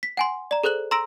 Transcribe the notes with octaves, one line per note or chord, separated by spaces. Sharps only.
B6
F#5 G#5 C6
D5 A#5
G#4 A4 C5 F#6 F#7
A#5 C6 E6 A#6 D7